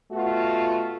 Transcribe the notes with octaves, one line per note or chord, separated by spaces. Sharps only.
B2 A3 F4 F#4